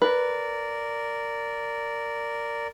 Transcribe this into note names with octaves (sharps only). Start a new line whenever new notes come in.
A#4 B4 D5